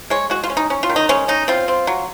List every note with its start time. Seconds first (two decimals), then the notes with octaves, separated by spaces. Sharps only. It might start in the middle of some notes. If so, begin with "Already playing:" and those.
0.10 G#3 C#5
0.30 G#3 F#4
0.43 F4
0.50 C#4
0.57 D#4
0.70 C#4
0.83 F4
0.89 D#3
0.96 D#4
1.09 G#3 C#4
1.28 C#4 D#4
1.48 C4 F4
1.68 C4
1.87 F#3